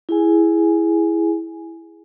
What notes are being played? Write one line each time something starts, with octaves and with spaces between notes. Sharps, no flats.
E4 G#4 G#5